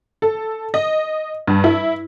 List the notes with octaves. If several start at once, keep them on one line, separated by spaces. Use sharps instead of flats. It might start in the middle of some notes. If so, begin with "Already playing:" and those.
A4
D#5
G2
E4